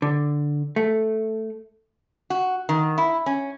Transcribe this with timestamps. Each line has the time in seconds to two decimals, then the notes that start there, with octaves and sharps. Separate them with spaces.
0.02 D3
0.76 A3
2.30 F#4
2.69 D#3
2.98 E4
3.26 C#4